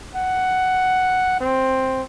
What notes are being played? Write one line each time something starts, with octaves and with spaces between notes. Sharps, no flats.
F#5
C4